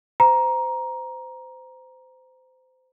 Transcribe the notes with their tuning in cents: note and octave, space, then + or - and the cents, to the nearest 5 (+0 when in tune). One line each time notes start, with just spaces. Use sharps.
C5 -25 A#5 +15